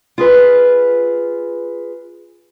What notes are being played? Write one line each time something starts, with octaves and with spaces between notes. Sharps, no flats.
F4 G#4 B4